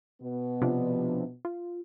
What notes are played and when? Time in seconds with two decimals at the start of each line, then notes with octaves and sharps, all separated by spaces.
0.22 B2 B3
0.62 C3 F3 D4
1.45 F4